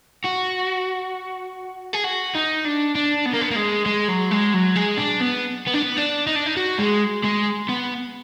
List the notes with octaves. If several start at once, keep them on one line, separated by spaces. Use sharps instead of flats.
F#4
G#4
F#4
D#4
D4
D4
B3
A#3
B3
A#3
G#3
G#3
F#3
G#3
F#3
G#3
D4
B3
B3
D4
B3
D4
D#4
D4
D#4
F#4
G#3
G#3
B3